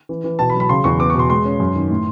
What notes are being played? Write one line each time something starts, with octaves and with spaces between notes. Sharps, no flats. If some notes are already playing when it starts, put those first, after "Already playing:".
E3
E3
B2 A5
B5
F#3
B5
C#3 C6
E2 C#6
B3 D6
C#6
B2 C6
G#3 C6
C#4
F#2
D#3
A2